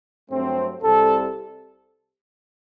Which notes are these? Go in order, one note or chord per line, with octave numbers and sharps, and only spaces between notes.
G2 F#3 A3 C4
C2 C3 G3 A4